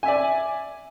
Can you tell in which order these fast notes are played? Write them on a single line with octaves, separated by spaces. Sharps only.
G#5 E5 D5